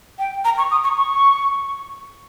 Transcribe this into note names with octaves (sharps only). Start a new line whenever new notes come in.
G5
A#5
C#6
D#6
C#6
C#6